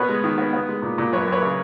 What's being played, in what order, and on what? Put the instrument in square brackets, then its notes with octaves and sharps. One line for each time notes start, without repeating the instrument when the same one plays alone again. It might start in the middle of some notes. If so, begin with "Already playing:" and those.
Already playing: [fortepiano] B2 B3 B4 C#5
G#3
D#3
B3
B3
G#3
A#2
A#2
F#2 B4 C#5
F#2 B4 C#5
C#3